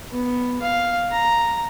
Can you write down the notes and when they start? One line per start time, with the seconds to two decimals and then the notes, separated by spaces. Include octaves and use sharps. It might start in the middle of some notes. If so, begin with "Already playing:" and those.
0.11 B3
0.62 F5
1.11 A#5